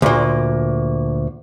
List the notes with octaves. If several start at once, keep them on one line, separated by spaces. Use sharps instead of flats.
D2 A#2